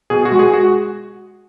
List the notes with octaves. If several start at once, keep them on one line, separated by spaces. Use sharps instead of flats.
B2 G#4
F#4
G#3
G#4
F#4